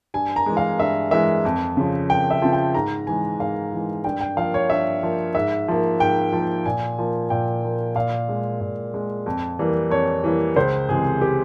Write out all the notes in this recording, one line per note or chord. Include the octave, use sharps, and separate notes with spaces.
G2 G#5
A#5
E3 G#3
F5
G2 E5
E3 G#3 E5
F2
C#3 F3
F2 G5
E5
C#3 F3
G5
G#2 A#5
E3 G#3 G#5
G#2 F5
E3 G#3
G2 G5
G5
F3 A#3 F5
C#5
G2 E5
F3 A#3
G#2 E5
F3 A#3
G#2 G5
F3 A#3
A#2 G#5
F3 A#3
A#2 G5
F3 A#3
A#2 F5
G#3
A#2
G#3
F2
E3 G3 A#3
F2 C#5
E3 G3 A#3
C#2 C5
C3 E3 G#3 G#4
G4